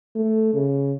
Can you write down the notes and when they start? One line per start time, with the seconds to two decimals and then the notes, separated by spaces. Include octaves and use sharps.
0.16 A3
0.54 C#3